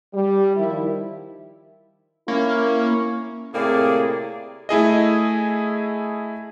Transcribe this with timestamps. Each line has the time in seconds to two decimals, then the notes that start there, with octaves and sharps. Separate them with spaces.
0.14 G3
0.57 D#3 F3 E4
2.28 A#3 C#4 E4
3.53 A2 C3 A#3 C4 G#4 D5
4.69 A3 E4 G#4 D#5